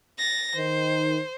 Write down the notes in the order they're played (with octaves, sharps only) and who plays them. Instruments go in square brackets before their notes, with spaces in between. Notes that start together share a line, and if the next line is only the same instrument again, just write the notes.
[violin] A6 A#6
[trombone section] D#3 [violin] C5